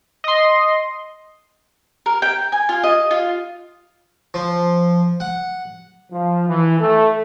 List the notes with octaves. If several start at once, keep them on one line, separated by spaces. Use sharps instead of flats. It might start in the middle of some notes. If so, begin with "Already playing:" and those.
D#5 C6
A#4
G5
G#5
F4
D#5
F4
F3
F#5
F3
E3
A3